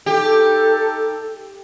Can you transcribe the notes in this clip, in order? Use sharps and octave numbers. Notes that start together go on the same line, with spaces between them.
D#4 G4 A4